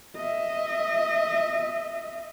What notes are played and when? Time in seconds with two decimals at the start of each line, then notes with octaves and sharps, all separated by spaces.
0.16 D#5 E5